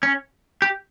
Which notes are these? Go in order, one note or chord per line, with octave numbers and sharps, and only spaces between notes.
C#4
G4